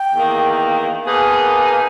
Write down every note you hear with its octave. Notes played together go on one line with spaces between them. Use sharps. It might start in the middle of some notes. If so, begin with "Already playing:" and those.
Already playing: G5
E2 D#3 A#3
B2 A#3 D#4 G#4 B4 G#5